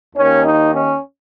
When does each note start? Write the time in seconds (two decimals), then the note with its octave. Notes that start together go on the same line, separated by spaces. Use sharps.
0.15 D#2 D#3 A#3 C#4
0.44 D#4
0.73 C#4